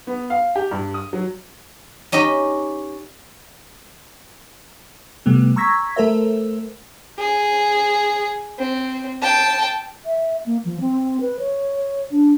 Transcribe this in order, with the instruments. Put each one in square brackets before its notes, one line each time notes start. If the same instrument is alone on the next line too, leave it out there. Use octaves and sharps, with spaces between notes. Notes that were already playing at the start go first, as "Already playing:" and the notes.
[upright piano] B3
F5
G4
G2
D#6
F#3
[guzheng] C#4 D#4 G4 D#5
[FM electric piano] C3 G3 A3 B3
A#5 C#6 E6 G#6 A#6 B6
A3 A4 A#4 C5 E5
[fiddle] G#4
C4
G5 A5
[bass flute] E5
A#3
F3
C4
B4
C#5
D4